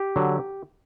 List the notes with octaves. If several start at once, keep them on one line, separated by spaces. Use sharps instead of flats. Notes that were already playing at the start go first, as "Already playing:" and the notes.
Already playing: G4
D3 F#3